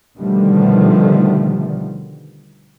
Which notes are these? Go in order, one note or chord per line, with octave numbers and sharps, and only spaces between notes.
B2 D3 D#3 F3 G3 A3